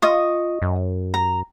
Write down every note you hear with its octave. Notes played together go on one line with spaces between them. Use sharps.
F4 D#5 C#6 D#6
F#2
A#5